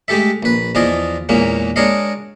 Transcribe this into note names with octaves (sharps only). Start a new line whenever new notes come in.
G#3 A3 G4 A4 E5
A#1 B4
E2 F3 F4 G#4 D5 D#5
E2 A#2 G#3 A#3 C#4
G#3 D4 A#4 C#5 D#5 F5